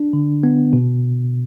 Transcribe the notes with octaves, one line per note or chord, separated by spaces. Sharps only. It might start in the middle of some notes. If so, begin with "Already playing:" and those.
Already playing: D4
D3
B3
B2